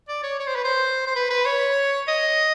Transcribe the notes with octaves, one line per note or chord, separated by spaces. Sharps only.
D5
C#5
C#5
C5
B4
C5
C5
B4
B4
C#5
D#5